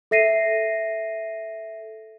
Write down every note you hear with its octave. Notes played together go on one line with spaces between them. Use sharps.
A4 E5 A#6 C7 D#7